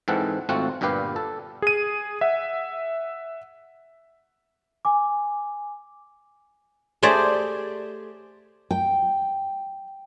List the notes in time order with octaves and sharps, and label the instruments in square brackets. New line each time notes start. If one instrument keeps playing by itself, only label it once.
[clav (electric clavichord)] G#2 E3 C4 A4 F#5
G#1 A3 C4 F4 F#4 F#5
G1 G2 A#2 G4 B4 F5
A4
[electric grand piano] G#4 D#7
E5 F#5
[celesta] G#5 D6
[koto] A3 G4 G#4 C5 D5
[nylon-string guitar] G5